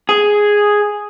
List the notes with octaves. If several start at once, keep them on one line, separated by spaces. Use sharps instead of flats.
G#4